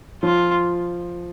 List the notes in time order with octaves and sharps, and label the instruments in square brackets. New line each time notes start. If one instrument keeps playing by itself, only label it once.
[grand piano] F3 [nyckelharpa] F4